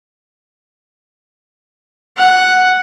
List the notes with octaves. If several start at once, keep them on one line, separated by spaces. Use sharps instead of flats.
F#5